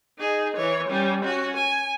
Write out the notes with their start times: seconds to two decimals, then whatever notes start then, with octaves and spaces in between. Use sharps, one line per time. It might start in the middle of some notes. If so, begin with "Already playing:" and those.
0.18 D#4 G#4
0.57 E3 C#5
0.89 G3 C#4
1.24 C#4 F#4
1.57 G#5